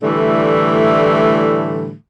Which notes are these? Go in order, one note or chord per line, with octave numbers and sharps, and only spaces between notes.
A2 D3 E3 G3 A3